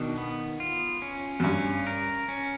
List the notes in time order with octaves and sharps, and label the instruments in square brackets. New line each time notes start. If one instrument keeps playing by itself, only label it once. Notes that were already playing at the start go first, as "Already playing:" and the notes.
Already playing: [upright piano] B2 [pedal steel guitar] D#3 D4
[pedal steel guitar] B3
F4
C#4
[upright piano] F#2
[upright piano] G2 [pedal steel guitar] C#4
[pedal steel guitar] A#4
C#4